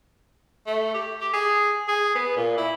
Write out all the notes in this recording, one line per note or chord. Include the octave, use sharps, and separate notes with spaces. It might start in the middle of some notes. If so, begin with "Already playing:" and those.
A3
G4
G4
G#4
G#4
B3
A#2
E4